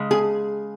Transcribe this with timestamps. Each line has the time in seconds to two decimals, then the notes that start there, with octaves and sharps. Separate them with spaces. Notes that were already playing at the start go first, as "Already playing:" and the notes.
Already playing: C#3 G#3
0.11 G#4